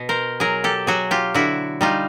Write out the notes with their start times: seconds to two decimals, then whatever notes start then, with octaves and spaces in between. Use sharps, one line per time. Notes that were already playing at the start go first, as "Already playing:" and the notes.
Already playing: B2
0.09 A#4 C5
0.40 F#3 G#4 A#4
0.64 G4 A4
0.87 F#3 F#4 G#4
1.11 F4 G4
1.34 D3 E4 F#4
1.81 G3 D#4 F4